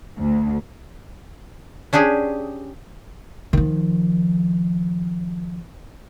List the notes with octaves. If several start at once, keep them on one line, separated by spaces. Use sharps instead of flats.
D2
C#4 D4 G4 G#4
D#3 F3